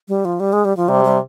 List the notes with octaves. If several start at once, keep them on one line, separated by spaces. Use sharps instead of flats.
G3
F3
G3
G#3
G3
F3
C3 G3
G3